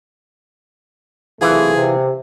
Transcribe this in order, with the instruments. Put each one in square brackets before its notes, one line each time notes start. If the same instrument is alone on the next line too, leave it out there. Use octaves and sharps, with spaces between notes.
[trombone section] B1 C3 A3 [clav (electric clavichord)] E3 F4 [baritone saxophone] G#4
[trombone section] C3